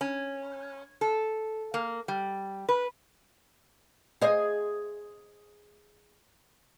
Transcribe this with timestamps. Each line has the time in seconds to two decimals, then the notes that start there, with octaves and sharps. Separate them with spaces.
0.01 C#4
1.01 A4
1.74 A#3
2.08 G3
2.69 B4
4.21 G#4 C5 D#5